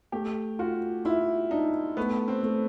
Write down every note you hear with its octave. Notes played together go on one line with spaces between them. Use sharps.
A3 G4
F4 F#4
E4 F4
D4 D#4
A3 B3
C4
A3